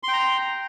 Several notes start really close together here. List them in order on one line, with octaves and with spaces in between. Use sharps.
C6 G5 A#5